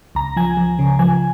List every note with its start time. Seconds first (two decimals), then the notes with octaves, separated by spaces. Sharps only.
0.15 C#2 A#5
0.36 F3 G#5
0.57 F3
0.79 C#3
0.99 F3 G#5